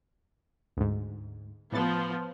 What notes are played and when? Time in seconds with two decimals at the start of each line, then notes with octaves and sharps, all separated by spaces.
0.77 D2 G#2
1.72 A2 F3 B3 A6